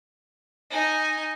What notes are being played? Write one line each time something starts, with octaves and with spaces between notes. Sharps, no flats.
D#4 G#5